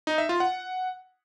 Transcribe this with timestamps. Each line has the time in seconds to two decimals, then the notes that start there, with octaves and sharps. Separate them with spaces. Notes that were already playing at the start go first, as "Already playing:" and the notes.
0.07 D#4
0.18 E5
0.29 F4
0.40 F#5